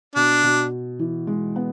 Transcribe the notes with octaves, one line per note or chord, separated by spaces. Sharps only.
B2 D4
B2
E3
G#3
B3